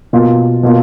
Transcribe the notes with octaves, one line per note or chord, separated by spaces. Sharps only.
B2 A#3 F4
B2 A#3 F4